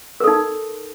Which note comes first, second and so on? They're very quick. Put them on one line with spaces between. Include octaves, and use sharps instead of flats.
A#4 A4 D#4